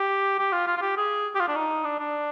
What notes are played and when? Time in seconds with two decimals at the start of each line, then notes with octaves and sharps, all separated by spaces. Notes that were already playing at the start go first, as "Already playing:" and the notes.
Already playing: G4
0.39 G4
0.52 F4
0.67 F4
0.77 F4
0.81 G4
0.97 G#4
1.35 G4
1.40 F4
1.48 D4
1.55 D#4
1.84 D4
1.99 D4